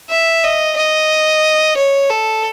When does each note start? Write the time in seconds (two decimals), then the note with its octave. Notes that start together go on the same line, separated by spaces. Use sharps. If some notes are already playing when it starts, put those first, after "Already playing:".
0.10 E5
0.44 D#5
0.77 D#5
1.77 C#5
2.10 A4